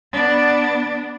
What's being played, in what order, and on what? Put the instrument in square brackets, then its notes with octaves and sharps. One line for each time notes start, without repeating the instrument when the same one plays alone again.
[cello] B3 D4